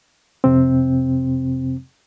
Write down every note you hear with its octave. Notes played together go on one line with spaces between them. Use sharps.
F2 C3 C4